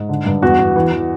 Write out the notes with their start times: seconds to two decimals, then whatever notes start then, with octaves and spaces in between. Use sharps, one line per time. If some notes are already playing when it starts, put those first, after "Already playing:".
Already playing: G#2
0.09 D3
0.26 G2
0.42 E2 F#4
0.59 E2
0.76 E3
0.92 E3